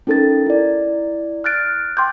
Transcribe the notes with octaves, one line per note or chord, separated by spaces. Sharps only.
C#4 D#4 A4 A#4 A6
E4 D5
F6 F#6 A6 D7
G5 C6 D6 G6